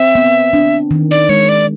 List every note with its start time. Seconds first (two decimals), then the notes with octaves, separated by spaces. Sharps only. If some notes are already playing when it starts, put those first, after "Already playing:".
Already playing: C4 E5
0.15 B3
0.53 D4
0.91 D#3
1.11 D5
1.29 G#3 C#5
1.49 D5